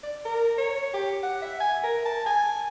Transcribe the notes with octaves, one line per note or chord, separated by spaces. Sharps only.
D5
A#4
C#5
G4
F#5
E5
G#5
A#4
A5
G#5